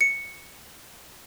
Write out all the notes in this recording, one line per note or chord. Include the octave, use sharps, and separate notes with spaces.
C#7